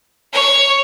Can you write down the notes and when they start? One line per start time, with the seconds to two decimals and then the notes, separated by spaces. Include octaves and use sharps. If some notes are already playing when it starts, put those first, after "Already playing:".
0.33 C#5